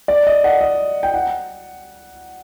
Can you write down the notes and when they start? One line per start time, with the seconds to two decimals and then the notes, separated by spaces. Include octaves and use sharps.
0.08 D5
0.27 D#5
0.44 F#5
0.61 D#5
1.03 G5
1.14 F#5